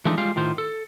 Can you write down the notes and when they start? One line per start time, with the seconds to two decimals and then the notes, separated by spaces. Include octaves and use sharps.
0.05 E3 F3 G#3 A3 D4 D#4
0.18 G3 G#3 F4 F5
0.36 A2 D#3 F4 C5
0.58 A4